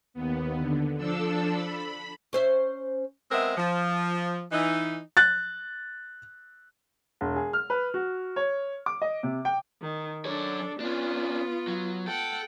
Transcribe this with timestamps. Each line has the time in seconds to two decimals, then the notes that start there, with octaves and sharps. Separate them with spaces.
0.14 D#2 B3
0.58 D3
0.97 F3 D4 A4 E6
1.54 B5
2.33 C#4 C5 E5
3.31 G#3 B3 C4 A#4 D#5 E5
3.57 F3
4.52 E3 D#4
5.17 F#6 A6
7.21 E1
7.36 G#4
7.53 F6
7.70 B4
7.94 F#4
8.36 C#5
8.86 D6
9.02 D#5
9.23 C3
9.45 G5
9.82 D#3
10.25 F#2 D4 A4 C#5
10.80 B3 C#4 D4 F4
11.68 F#3
12.07 A4 F#5 G5